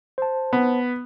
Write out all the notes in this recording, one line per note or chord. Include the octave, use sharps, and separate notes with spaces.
C5 A5
B3